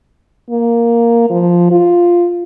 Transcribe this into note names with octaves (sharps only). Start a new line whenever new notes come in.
A#3
F3
F4